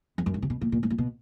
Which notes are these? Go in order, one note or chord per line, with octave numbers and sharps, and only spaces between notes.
F2
F#2
G2
C3
B2
A#2
A#2
A2
A#2
B2